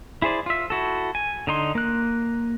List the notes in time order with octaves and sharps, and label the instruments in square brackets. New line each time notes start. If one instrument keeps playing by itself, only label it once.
[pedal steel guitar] E4 G#4 C5 D5
F4 E5
E4 F#4 A4
G#5
D3 D#4 C6
A#3 F#6